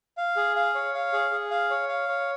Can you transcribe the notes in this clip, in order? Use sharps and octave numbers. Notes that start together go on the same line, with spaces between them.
F5
G#4
F5
C#5
F5
G#4
G#4
F5
C#5
F5
C#5